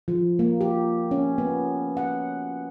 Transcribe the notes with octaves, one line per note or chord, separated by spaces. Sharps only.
F3
A#3
G4
C#4
B3
F#5